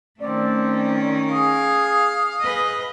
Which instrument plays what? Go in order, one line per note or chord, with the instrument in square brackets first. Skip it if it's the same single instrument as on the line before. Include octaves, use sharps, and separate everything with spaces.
[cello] D#3 C#4 [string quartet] A3 [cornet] C4 [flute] D5
[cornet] G#4 [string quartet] F5 [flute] D#6
[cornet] G#4 [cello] B4 D#5